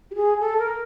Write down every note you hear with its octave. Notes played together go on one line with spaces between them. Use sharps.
G4
G#4
A4
A#4